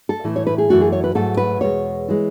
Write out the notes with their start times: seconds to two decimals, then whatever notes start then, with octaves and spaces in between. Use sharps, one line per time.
0.09 A4
0.24 A2 E3 A3
0.36 C#5
0.47 B4
0.58 G#4
0.69 F#2 E3 A3 F#4
0.81 G#4
0.92 C#5
1.04 B4
1.15 G#2 F#3 A3 A4
1.37 B4
1.61 E2 B2 G#3 C#5
2.08 E3 G#3